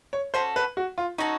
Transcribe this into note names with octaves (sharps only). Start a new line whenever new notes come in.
C#5
C#4 F#4 A4 C5
B4
F#4
F4
C#4 D#4 F#4 A4